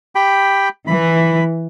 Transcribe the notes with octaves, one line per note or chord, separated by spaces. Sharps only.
G4 G5 B5
E3 B5